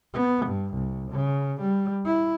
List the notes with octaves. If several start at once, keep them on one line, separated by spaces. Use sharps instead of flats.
B3
G2
C2
C#3
G3
E4